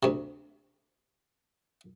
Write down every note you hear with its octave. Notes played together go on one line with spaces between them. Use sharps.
D2 C3